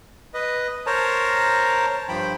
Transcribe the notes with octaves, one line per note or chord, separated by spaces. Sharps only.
B4 D#5
A#4 C5 C#5 A5 A#5
G2 F3 C5 G5 B5